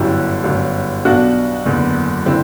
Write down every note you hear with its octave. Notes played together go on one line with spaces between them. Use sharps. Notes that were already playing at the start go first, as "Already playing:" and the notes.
Already playing: G1 F#2 D3 E4 G4
G1 F#2 D3
B1 B2 D4 F#4
F#1 E2 D3
D3 C4 E4